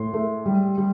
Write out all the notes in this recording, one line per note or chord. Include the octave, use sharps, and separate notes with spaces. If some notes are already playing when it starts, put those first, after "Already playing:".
Already playing: A2 C6
A3
G3
G3